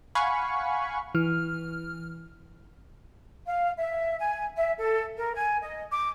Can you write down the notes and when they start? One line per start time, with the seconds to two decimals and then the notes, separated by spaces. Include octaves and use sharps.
0.15 F5 F#5 G#5 B5 C#6
1.15 E3 F6
3.47 F5
3.78 E5
4.18 G#5
4.56 E5
4.78 A4
5.16 A#4
5.34 G#5
5.62 D#5
5.92 D6